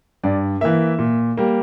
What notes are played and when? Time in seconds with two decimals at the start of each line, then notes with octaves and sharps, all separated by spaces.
0.23 G2 D5
0.61 E3 A#3 E5
0.99 A#2
1.37 G3 A#3